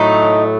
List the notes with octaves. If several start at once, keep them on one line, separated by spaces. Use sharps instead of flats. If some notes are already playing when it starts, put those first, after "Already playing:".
Already playing: A2 F#3 A3 D#4